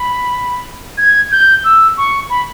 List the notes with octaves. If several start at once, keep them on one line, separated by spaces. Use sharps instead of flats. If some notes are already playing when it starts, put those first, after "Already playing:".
Already playing: B5
G#6
G6
E6
C#6
B5